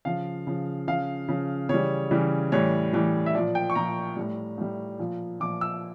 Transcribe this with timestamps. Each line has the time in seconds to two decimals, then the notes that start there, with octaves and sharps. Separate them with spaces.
0.05 C#3 F3 F5
0.47 C#3 F3
0.88 C#3 F3 F5
1.28 C#3 F3
1.69 C#3 E3 G3 C#5
2.11 C#3 E3 G3
2.52 A2 E3 G3 C#5
2.93 A2 E3 G3
3.26 E5
3.35 A#2 F3 D5
3.55 G5
3.70 C#6
3.75 A#2 F3 A#5
4.17 A2 G3
4.58 A2 G3
4.99 A#2 F3
5.40 A#2 F3 D6
5.61 E6